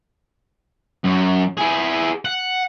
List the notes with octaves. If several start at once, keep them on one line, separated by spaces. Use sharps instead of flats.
F#2
E4 G#4
F#5